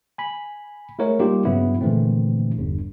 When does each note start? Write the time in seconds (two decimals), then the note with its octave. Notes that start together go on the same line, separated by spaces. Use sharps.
0.18 G#5 B5
0.99 G#3 A3 E4 A#4 C#5 F#5
1.19 G3 A#3 D#4 F4 G4
1.45 G2 C#3 F#3 B3 E4
1.81 A#2 D3 E3 G#3 A3 C4
2.58 G1 E2 G2